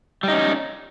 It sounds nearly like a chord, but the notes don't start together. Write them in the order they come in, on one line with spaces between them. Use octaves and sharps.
G3 D#4 C#4